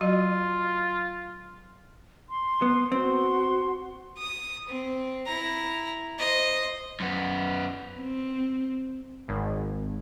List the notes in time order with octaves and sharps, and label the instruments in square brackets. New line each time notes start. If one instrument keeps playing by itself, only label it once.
[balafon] F#3 F#4 D#5 [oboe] F4
[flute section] C6
[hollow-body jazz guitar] B3
[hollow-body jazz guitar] C4 [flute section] F#4 C6
[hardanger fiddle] D#6
C4
E4 A#5
C5 D#5
[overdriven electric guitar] F#2 B3
[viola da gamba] C4
[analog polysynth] G#1